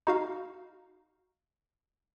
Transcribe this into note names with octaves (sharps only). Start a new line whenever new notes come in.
D#4 F#4 F5